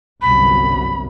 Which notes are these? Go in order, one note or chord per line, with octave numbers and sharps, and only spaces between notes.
G1 C2 F#2 B5